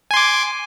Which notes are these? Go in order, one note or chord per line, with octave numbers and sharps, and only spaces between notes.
G#5 C6 D6